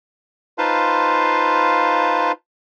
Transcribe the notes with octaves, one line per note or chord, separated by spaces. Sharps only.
D#4 F4 B4 C5 F5 A5